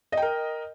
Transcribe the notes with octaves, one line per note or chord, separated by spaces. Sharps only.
A#4 D#5 G5